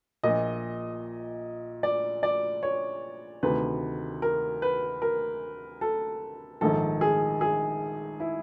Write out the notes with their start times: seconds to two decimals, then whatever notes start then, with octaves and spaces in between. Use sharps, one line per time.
0.23 A#1 A#2 D#5
1.83 D5
2.23 D5
2.63 C#5
3.43 D2 C3 D#3 B4
4.22 A#4
4.62 B4
5.02 A#4
5.81 A4
6.61 A#1 G#2 D#3 A4
7.01 G#4
7.41 G#4
8.20 E4